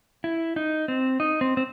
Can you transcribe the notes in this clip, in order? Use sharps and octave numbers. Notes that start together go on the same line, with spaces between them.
E4
D#4
C4
D#4
C4
C4